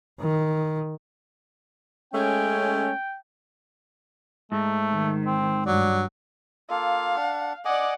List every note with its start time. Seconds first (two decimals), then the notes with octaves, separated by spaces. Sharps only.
0.20 D#3
2.13 G#3 A3 C#4 G5
4.52 G#2 A3
4.92 D#3
5.26 C4
5.66 G2 F#3 D5
6.70 A#3 F4 A4 F5
7.16 D4 F#5
7.65 D5 D#5 F#5 G#5 D6